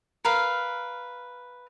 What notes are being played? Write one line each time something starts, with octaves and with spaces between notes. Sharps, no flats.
A#4 B4 F5